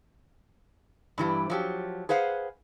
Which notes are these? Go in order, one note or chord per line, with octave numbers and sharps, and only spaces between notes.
G2 E3 G3
F3 F#3 G4
G#4 B4 C5 F5 F#5